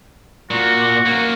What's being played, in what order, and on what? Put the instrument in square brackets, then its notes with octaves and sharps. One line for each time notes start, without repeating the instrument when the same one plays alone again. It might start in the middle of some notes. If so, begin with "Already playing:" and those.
[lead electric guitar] A#2 [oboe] F#4
[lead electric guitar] A#3 C#4